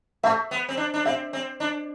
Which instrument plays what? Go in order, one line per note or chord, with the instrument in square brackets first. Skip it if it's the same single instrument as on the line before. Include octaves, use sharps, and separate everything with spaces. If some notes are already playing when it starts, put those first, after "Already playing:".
[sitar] A3 [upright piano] E5
[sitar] B3
C4
D4
D4
[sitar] C4 [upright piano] E5
[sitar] C4
D4